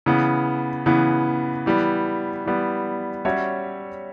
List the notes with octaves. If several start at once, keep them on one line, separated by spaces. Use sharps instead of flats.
C#3 E3 B3
C#3 E3 B3
E3 G3 B3
E3 G3 B3
G3 C#4 F#4 C#5 E5